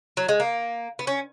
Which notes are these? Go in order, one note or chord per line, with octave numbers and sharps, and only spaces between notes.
F#3
G#3
A#3
B3
C#4